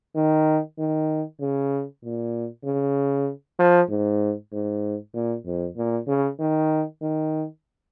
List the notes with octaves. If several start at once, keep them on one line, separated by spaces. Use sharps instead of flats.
D#3
D#3
C#3
A#2
C#3
F3
G#2
G#2
A#2
F2
A#2
C#3
D#3
D#3